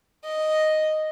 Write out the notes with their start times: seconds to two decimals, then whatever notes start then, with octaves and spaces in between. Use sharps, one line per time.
0.24 D#5